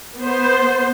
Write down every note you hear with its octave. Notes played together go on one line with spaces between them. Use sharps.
B3 C5